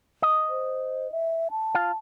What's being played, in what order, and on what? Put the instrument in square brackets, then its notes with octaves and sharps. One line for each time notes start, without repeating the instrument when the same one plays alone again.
[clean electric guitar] D#5
[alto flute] C5
E5
A5
[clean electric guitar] F4 F5